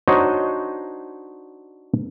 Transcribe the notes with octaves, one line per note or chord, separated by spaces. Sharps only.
D4 D#4 F#4 C5 C#5 D#5